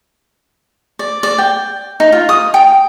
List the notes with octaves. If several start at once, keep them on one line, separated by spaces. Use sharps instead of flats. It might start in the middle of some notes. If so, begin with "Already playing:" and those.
D5
D5
G5
D#4
F4
D#6
G5